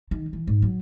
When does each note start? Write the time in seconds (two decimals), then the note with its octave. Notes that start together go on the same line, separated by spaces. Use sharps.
0.11 D#3
0.33 E3
0.47 G#2
0.62 F#3